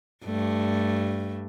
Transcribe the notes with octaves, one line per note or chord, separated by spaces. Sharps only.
G2 A3